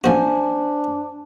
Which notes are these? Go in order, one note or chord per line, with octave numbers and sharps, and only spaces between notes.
A1 F3 D4 F#4 C5 G#5